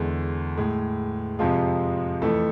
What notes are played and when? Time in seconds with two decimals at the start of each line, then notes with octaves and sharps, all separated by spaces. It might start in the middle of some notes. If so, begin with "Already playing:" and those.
Already playing: E2 D3 G#3
0.58 A2 G#3
1.39 F2 C3 F3 G#3 F4
2.22 F2 E3 A3 A4